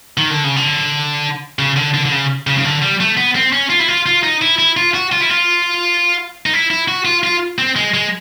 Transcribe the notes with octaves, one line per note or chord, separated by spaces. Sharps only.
D#3
D3
C#3
D3
C#3
D3
D3
D3
C#3
C#3
C#3
D3
G3
A3
B3
C4
C#4
F4
E4
F4
F4
D#4
E4
E4
F4
F#4
F4
E4
F4
D#4
E4
E4
F#4
F4
F4
C4
G#3
G#3